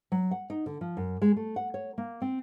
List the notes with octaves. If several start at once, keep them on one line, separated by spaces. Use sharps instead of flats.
F#3
F#5
D#4
D3
F3
F#2
G#3
A3
F#5
C#5
A#3
C4